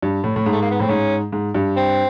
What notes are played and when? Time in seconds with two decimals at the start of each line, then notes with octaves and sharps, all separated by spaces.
0.02 G2
0.24 A2
0.36 A2
0.46 G#2
0.52 A3
0.62 A#3
0.71 B3
0.80 A2 C4
0.89 G#2 C#4
1.33 G#2
1.55 G2
1.76 C4